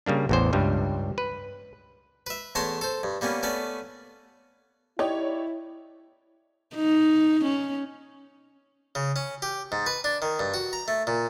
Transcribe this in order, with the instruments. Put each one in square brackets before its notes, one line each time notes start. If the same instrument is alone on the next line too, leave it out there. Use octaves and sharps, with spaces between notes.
[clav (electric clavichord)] C#3 G3 A#3 D4
A1 E2 C5
C#2 G2 G3
B4
[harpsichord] B4 E5
E2 A3 C#5 A5 A#5 C6
A4 C5
G2
G3 A#3 B3 C#4
A3 B3 C#4 D5
[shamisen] D#4 [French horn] E4 [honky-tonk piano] G4 C#5 D5
[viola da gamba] D#4
C#4
[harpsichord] C#3
C#4
G4
G#2
B4
D4
D#3
G2
F#4
A#5
A3
A#2